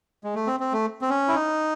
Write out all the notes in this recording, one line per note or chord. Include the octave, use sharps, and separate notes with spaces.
G#3
A3
C4
C4
A3
C4
C#4
E4
D#4